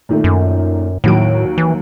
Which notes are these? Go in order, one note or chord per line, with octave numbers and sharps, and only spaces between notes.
A#2 D#3 A3
F#2
D#2 A2 F#3 D7
E3